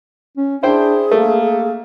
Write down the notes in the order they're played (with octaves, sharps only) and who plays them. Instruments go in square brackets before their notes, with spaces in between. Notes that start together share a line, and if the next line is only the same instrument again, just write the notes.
[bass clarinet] C#4
[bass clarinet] D4 [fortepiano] E4 C5 G5 [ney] G#4
[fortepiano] A3 [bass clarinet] A#3